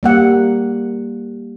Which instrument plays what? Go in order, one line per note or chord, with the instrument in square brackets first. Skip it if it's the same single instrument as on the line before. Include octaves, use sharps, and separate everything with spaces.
[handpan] G3 A#3 F#5